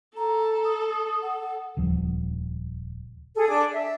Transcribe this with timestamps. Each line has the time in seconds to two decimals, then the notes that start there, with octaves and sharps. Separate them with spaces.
0.17 A4 A#5
0.65 D#6
1.22 F#5
1.77 D#1 C#2 F3
3.35 G#4 A4
3.48 D4 D6
3.73 E5